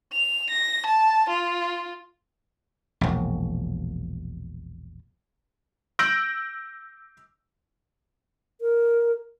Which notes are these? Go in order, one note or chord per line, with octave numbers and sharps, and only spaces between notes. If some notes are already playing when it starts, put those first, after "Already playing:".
F7
A#6
A5
F4
E1 A#1
E6 G6 A#6 D7 F#7
A#4